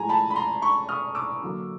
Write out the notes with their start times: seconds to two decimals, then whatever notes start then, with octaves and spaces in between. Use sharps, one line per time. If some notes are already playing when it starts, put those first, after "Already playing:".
Already playing: A2 F3 G#3 G#5 A#5
0.09 A5 B5
0.30 B5
0.36 A#5 C6
0.62 B5 C#6
0.89 D#6 F6
1.15 D6 E6
1.42 D3 F#3 A#3